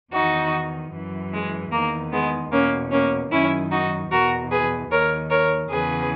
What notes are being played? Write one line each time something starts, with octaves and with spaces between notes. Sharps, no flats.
E2 D#3 D#4 F#4
F#2 E3
G#3
E2 D#3 A#3
G#3 B3
E2 B2 A#3 C#4
A#3 C#4
F#2 D#3 C#4 E4
D#4 F#4
E2 B2 F#4 A#4
G#4 B4
D#2 D#3 A#4 C#5
A#4 C#5
E2 C#3 E3 G#4 B4